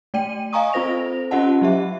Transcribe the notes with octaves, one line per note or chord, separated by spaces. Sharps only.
A3 D5 G5 D#7
D#5 F5 G#5 A#5 C#6 D#6
C4 F4 A4 C5 A#6 F7
C#4 F4 G4 D#5 F#5 A5
F#3 G4 E5